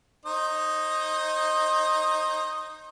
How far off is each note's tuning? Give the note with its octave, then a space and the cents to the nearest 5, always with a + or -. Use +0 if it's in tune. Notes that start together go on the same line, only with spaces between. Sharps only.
D#4 +0 C5 +30 D#5 +0